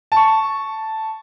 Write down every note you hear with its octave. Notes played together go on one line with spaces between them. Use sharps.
A5 C#6